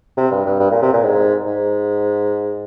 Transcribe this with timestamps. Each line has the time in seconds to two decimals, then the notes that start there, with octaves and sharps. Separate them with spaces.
0.17 C3
0.32 G2
0.46 G2
0.60 G2
0.71 A#2
0.82 C3
0.93 A#2
1.04 G#2
1.47 G#2